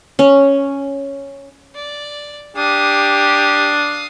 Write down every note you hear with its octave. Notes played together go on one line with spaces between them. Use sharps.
C#4
D5
D4 G4 F5 D#6